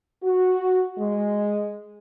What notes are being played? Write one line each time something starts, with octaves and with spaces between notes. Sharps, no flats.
F#4
G#3